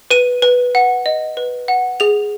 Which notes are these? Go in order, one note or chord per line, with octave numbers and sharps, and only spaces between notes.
B4 D#7
B4
F#5
D#5
B4
F#5
G#4 F7